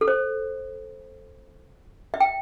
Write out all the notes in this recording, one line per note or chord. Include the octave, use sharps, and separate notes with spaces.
A4
C5
E5
G5